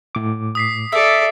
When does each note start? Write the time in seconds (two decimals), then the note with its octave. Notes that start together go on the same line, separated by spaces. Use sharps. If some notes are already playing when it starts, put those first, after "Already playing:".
0.15 A2 D6
0.55 D#6 B6 C7
0.92 A4 D5 E5